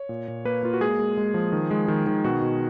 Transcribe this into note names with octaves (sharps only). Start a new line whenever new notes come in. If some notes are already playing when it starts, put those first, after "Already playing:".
Already playing: C#5
A#2
A#2
A#3 B4
A#3 F4
F#4
G#3 G#4
G#3
G#3
F3
D#3
G#3
D#3
D#3
B2 F#4
B2